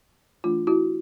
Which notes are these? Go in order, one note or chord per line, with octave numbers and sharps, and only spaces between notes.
E3 A3 D4 F4
E4 F#4